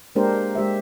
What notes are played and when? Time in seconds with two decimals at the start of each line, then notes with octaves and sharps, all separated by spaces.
0.15 G#3 A#3 D4 G4 A#4 C5
0.55 G#3 G4 C5 E5